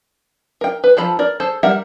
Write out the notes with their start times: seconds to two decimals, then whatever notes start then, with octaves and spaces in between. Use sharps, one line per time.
0.61 A#4 G5
0.84 B4
0.97 F3 A4 A#5 B5
1.19 A#4 D5
1.40 G#4 A4 C5
1.63 G3 A#4 E5 F#5